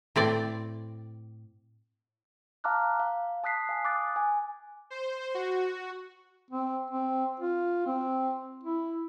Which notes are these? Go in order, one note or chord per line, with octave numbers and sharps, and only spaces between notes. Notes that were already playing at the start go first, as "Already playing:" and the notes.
A2 C4 D5
F5 A5 A#5 D6 F6 F#6
F5
A5 D#6 F#6 B6 C7
F5 G#5
D6 D#6 F#6 A6
G#5
C5
F#4
C4
C4
F4
C4
E4